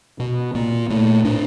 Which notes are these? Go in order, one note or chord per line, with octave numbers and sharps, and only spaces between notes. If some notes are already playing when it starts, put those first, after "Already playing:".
B2
A#2 A#3
A#2 A3
A2 D4